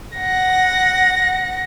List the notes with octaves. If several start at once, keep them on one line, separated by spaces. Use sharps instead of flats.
F#5 A#6